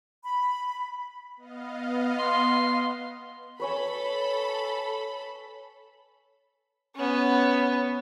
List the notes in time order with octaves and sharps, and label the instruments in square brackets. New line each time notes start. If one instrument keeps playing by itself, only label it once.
[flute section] B5
[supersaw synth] B3 D#5 F5
[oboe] C6
[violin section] A4 B5 [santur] B4 C#5 G#5
[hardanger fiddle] B3 C#4